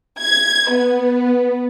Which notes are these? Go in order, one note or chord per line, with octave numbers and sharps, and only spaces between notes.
G#6
B3